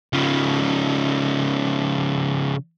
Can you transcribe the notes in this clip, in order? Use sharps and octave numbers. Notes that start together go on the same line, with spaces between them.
C#3 F3